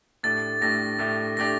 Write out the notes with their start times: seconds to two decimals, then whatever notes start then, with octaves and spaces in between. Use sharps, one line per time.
0.23 A2 A3 D4 G4 A6
0.61 A2 A3 D4 G4 A#6
0.99 A2 A3 D4 G4
1.37 A2 A3 D4 G4 A#6